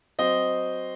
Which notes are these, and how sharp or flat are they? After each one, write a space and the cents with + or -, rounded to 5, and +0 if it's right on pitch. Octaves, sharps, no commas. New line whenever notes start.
F#3 +0 C4 -10 D#5 -5